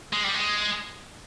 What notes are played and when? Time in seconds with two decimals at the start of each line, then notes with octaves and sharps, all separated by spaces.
0.13 G#3
0.24 G3
0.34 G#3